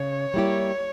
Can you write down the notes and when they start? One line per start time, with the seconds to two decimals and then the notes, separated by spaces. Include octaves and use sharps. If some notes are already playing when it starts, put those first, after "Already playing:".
Already playing: C#3 C#5
0.34 G3 A#3 E4 G4